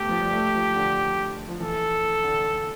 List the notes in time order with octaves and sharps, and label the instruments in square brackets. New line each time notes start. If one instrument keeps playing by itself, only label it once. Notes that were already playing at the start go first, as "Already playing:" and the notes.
Already playing: [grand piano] A3 B3 [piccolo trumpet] G4
[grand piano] F3
G3
A3
F3
D3
F3
[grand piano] E3 [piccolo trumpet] A4
[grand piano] D3